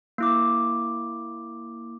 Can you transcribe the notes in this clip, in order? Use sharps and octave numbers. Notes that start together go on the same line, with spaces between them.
A#3 E4 D6